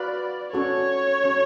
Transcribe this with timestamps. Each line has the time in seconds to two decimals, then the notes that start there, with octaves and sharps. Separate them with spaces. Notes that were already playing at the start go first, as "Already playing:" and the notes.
Already playing: F#4 B4 D5 F5 B5
0.53 C#4 F#4 A4 C#5
1.24 C#4 F#4 A4